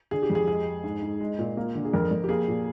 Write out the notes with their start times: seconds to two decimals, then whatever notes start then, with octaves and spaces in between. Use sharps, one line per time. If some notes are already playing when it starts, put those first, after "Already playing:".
0.11 D3 G#4
0.22 G4
0.30 F2
0.35 G#4
0.48 G#3 G#4
0.66 G#3
0.84 G#2
1.02 G#2
1.20 G#3
1.39 A#2
1.57 A#3
1.75 D3
1.85 G#4
1.94 F2 A#4
2.11 F2
2.24 G4
2.29 A#3 G#4
2.48 A#2